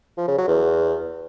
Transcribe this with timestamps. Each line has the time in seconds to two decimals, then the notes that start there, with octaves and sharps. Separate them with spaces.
0.18 F3
0.28 C#3
0.38 F#3
0.48 E2